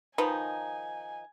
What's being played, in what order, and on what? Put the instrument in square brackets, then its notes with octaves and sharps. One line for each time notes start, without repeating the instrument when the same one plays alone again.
[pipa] D#3 F3 D#4 [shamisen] B4 [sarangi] G#5